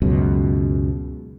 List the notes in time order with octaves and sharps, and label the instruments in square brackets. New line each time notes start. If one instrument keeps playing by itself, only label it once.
[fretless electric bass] C#2 F#2 B2